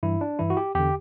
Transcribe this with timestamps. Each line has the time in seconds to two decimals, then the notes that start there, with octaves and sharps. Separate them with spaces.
0.03 G2 E3 E4
0.21 D4
0.39 G2 E3 E4
0.50 F#4
0.57 G4
0.75 E2 D3 G4